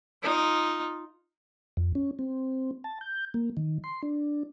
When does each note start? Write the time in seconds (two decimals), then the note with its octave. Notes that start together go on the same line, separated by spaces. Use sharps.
0.23 D#4 F4
1.77 F2
1.95 C#4
2.19 C4
2.84 A5
3.01 G6
3.34 A#3
3.57 D#3
3.84 C6
4.03 D4